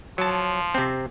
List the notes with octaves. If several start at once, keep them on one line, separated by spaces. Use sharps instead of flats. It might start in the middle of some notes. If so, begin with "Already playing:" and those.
F3 F#3 A5
C3 C4